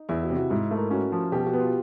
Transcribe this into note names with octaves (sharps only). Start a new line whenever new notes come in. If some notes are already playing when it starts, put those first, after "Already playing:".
Already playing: D#4
E2 E4
F#4
C3
F#4
G#2 E4
A3
A#4
C#4 F#4
F3
B2 G4
F#4
B3
F4